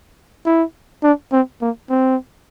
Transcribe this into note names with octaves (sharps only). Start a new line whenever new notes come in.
E4
D4
C4
A#3
C4